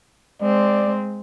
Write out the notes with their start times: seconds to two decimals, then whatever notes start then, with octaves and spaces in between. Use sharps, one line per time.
0.42 G#3 C4 D5